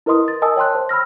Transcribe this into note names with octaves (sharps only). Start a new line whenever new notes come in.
E4 A#4 B4 D#5 C6 D#6
A6
A#4 D#5 G#5 A5 D#6 E6
C#5 G5 A5 C6 F#6
C5
B5 E6 F6 A#6